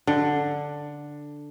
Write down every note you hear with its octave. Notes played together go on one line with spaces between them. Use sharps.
D3